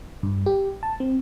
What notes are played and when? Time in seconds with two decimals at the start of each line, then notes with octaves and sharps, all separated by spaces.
0.23 G2
0.46 G4
0.83 A5
1.00 C4